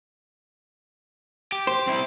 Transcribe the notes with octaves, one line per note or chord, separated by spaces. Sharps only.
G4
C5
C4 E4